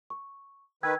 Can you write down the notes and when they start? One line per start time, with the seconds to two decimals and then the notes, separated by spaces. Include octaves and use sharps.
0.10 C#6
0.83 D#3 B4 G5 E6 G#6